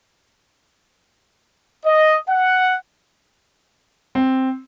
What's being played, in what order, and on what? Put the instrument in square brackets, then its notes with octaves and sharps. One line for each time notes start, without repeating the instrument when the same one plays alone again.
[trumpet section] D#5
F#5
[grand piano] C4